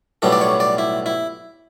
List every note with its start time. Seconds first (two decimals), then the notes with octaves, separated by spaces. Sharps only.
0.22 B1 A2 G3 B3 A4
0.32 D5
0.41 C#5
0.60 D5
0.78 E4
1.06 E4